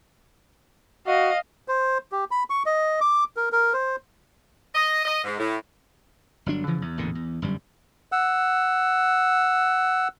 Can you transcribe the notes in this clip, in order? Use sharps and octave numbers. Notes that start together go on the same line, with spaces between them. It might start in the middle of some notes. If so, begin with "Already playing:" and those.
F#4 D#5 F5
C5
G4
B5
C#6
D#5
D6
A#4
A#4
C5
D#5
D#5
G#2
A2
G1 F#3 D4
C#3 E3 F3
E2
A1 E2 A#2 D3
E2
G1 F#2 G3
F#5 E6